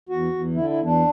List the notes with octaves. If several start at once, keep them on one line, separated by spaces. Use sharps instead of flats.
E2 F#4
E2
D3 E4
E4
E2
D4